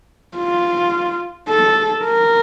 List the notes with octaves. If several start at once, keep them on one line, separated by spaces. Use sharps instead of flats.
F4
A4
A#4